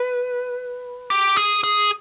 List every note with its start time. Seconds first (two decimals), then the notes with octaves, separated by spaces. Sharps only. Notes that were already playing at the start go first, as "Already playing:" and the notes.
Already playing: B4
1.10 G4
1.37 G#4
1.64 G#4